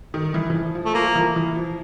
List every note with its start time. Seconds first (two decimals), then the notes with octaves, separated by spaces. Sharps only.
0.14 D#3
0.34 E3
0.50 E3
0.54 F3
0.75 F3
0.85 A3
0.95 F3 A#3
1.07 F3
1.15 E3
1.36 E3
1.56 F3